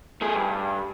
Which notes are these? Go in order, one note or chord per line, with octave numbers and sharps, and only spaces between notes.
A3 G#4
G2